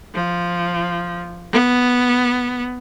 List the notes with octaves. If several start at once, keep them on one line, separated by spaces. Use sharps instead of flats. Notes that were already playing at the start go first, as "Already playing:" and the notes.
F3
B3